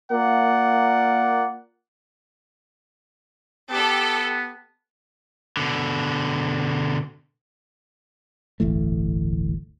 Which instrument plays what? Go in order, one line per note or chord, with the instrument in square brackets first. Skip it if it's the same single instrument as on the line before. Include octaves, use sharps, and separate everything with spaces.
[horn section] A#3 F4 A#4 D5 F#5
[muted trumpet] B3 [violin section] G4 A4
[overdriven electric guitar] B2 D3
[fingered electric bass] D1 G1 E3 A3